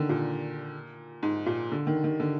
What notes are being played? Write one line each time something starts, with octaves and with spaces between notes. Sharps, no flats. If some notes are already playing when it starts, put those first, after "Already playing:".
Already playing: D3 D#3
A#2
G#2
A#2
D3
D#3
D#3
D3